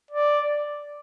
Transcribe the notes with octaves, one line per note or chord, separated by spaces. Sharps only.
D5